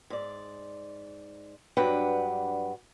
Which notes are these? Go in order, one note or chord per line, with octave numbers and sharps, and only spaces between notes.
G#2 D5
G2 F#3 D4 B4 F#5 G5